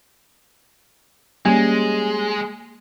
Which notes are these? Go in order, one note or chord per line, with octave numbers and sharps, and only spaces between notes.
G3 G#3 A#3 C#4